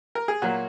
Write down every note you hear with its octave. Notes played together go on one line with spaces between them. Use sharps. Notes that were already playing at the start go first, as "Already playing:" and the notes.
A#4
G#4
A#2 F#3 A#3 F#4